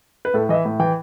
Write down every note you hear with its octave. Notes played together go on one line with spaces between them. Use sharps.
B4
A2 A4
E3 D#5
E5
A2
E3 G5